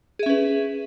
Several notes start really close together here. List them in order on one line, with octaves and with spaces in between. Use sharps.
G#4 E5 C#4 B4